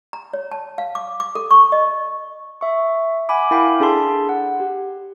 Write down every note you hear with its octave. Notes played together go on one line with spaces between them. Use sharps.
A#5
C#5
A5
F5
D6
D6
A4
C#6
D#5
E5 C#6
F#5 G#5 B5 D6
E4 A#4 F5 G5 B5
D4 G#4 A4 A5 C6
F#5
G4